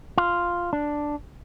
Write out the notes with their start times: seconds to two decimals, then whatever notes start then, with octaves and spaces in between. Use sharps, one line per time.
0.18 F4
0.73 D4